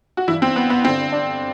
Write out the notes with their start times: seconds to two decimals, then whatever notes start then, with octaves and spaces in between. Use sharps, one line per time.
0.17 F#4
0.28 G2 E3 E4
0.42 C4
0.56 B3
0.70 B3
0.84 G2 D3 C4
1.12 D4